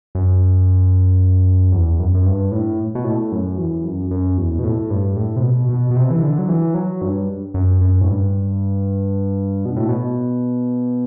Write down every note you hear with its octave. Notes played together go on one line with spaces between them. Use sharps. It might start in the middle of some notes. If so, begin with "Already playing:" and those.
F#2
E2
F#2
F#2
G2
A2
B2
A2
F#2
E2
F#2
F#2
E2
B2
A2
G2
A2
C3
B2
B2
B2
C3
E3
D3
F#3
E3
F#3
G2
F#2
F#2
A2
G2
B2
A2
B2